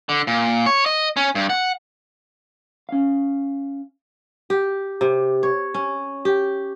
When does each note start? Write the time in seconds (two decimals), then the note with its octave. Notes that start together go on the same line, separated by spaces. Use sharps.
0.09 D3
0.27 A#2
0.66 C#5
0.86 D#5
1.17 C#4
1.35 G2
1.50 F#5
2.89 C#4 F5
4.50 G4
5.01 C3
5.43 C#5
5.74 C#4
6.25 G4